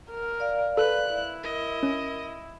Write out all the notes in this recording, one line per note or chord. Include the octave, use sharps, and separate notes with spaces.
A#4
D5 F5
A4 B4 F#6
E4
A#4 D#5
C#4